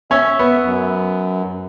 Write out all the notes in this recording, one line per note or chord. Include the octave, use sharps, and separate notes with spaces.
C#4 C#5 E5
B3
F#2